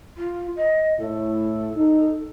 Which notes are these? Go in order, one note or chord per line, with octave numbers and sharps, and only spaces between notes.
F4
D#5
A2 E4 A4
D#4